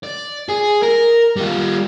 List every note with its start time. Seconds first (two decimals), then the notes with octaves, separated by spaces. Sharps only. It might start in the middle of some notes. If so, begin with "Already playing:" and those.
0.04 D5
0.49 G#4
0.83 A#4
1.36 G3 F4